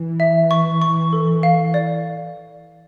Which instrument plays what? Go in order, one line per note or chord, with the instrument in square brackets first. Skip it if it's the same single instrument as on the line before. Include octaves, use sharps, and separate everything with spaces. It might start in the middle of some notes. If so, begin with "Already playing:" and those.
Already playing: [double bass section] E3
[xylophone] E5
C#6
C#6
A4
F5
D5